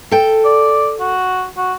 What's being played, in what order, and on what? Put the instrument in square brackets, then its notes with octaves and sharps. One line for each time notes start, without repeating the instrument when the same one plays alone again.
[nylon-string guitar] A4 G5
[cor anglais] D5
F#4
F#4